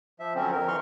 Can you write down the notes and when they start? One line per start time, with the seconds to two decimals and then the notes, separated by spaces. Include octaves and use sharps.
0.20 F3 E5
0.35 D3 F3 F#3 C4 C#4
0.52 F2 A#4
0.68 E3 C6 C#6 F6